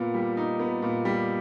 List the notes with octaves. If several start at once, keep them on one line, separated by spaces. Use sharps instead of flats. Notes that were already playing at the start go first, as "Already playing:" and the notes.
Already playing: A#2 B3
G3
D#4
B3
A#2
G3